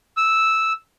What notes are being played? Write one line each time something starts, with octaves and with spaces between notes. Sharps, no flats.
E6